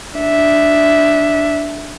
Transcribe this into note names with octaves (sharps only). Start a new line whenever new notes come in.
D4 E5